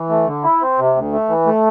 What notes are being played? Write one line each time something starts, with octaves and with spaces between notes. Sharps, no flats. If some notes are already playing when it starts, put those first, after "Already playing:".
Already playing: E3
A3
D3
E4
C4
C3
D2
A3
E3
A3